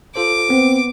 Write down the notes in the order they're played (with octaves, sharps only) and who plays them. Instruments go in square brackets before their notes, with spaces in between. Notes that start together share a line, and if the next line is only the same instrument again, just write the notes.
[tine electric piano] F4 A4 C5 [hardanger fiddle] D6
[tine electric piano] B3 [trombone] C4